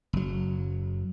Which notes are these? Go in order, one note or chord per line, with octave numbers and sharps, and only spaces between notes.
F#1 F#3